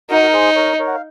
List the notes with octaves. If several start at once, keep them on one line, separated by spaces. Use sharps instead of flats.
D#4 F#4 A#4
A#4
G#4 C5
A#4 C#5
A#4 C#5
F#5
F5